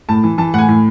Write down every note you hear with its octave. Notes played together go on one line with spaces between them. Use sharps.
A2 A5
E3
E3 A5
A2 F#5 G#5
A2